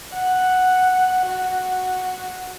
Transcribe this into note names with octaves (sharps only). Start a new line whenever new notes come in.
F#5
F#4